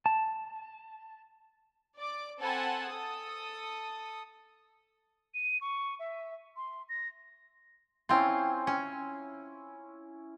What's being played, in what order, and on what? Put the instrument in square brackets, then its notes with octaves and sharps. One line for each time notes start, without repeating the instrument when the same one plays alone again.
[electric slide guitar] A5
[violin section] D5 D6
C4 A4 F#5 G#5 A5 B5
A4 D#6
[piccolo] D#7
C#6
E5
C6
A#6
[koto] C4 F4 [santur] C#4 E4 C6
[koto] C#4 [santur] G#5